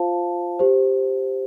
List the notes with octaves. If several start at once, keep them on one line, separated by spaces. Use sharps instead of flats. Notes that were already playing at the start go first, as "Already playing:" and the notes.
Already playing: F4 C5 F5 A5
G4 C5